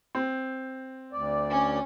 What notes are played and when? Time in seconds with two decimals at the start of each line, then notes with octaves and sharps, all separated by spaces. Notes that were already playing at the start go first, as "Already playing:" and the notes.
0.15 C4
1.13 D2 D5
1.50 C#4